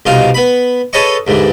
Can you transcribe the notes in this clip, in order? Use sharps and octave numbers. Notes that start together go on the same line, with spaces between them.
C2 B2 D#4 F4 F5
B3 B5
G#4 A4 B4 C#5 D#5 C#6
D#2 G#2 D3 E3